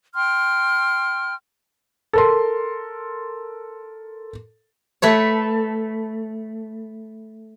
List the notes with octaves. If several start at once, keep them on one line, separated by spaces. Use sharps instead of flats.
G5 C6 F6
A4 A#4 C6
A3 B4 C#5